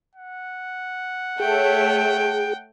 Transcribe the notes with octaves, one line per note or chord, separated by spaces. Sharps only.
F#5
A3 G#4 C#5 G5